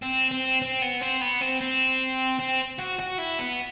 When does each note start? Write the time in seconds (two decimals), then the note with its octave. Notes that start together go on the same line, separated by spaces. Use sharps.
0.03 C4
0.32 C4
0.62 C4
0.82 B3
1.01 C4
1.21 B3
1.41 C4
1.61 C4
2.40 C4
2.79 F#4
2.99 F#4
3.18 E4
3.39 B3